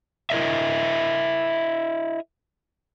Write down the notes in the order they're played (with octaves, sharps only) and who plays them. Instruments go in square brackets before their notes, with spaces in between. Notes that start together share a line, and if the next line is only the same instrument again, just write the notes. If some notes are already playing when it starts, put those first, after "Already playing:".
[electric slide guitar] E4 A#4 D#5 E5